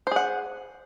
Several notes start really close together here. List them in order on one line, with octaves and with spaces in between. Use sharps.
C5 G#4 F#5